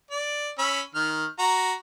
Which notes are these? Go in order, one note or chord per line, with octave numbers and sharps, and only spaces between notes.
D5
C#4 B5 E6
D#3 F6
F#4 A#5